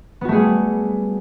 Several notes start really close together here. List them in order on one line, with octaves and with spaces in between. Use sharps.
B3 F#4 A3 G#4 G3